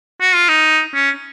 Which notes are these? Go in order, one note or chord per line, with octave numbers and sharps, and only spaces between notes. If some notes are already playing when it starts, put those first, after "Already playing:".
F#4
F4
D#4
C#4